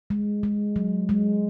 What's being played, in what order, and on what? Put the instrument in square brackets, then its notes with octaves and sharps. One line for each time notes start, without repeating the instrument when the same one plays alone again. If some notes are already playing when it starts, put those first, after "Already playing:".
[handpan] G#3
G#3
F#3
G#3